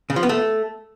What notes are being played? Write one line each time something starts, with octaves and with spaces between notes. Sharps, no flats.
C#3
F3
B3
A3